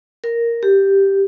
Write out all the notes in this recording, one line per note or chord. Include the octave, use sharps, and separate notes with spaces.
A#4
G4